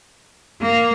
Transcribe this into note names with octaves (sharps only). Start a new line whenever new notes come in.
A#3